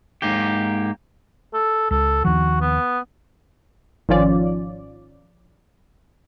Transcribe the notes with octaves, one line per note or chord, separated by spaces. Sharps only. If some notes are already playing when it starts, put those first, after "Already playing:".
G#2 A#3 G4
A4
C#2 A4
D#2 D#3 F3 F#4
B3
G#1 D#3 F3 C#4 F4 D5